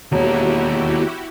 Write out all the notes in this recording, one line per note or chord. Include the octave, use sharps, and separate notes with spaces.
E1 D#2 A#3 E4 F#4 G4